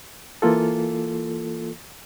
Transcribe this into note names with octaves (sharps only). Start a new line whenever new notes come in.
E3 A#3 F4 A4